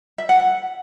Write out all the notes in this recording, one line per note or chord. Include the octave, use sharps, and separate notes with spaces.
E5
F#5
F#5